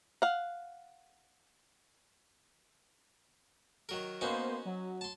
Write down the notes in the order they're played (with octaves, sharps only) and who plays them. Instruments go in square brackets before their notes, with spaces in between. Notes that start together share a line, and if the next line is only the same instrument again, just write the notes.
[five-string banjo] F5 F#5
[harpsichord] D#3 F#3 A#4
[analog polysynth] A#3 B3 C5 [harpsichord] C#4 D#4 F#4
[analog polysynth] F#3
[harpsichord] A5 C6